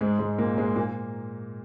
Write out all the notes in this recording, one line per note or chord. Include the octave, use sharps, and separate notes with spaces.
G#2 G#3
G#2 G#3
A#2 A#3
G#2 G#3
A#2 A#3